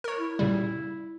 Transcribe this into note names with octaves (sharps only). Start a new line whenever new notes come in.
A#4 C#5
E4
A#2 C#3 G3